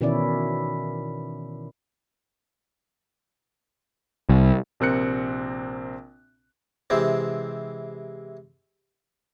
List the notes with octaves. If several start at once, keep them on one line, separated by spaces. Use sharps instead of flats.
B2 D#3 E3 C#4 E4 D5
C2
A#1 C3 C4 A#4 F#6 C#7
C3 E3 G#3 C4